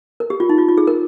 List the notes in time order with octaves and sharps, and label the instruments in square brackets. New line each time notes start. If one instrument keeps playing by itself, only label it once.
[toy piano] A#4
G4
F4
D#4
F4
F4
G#4
A#4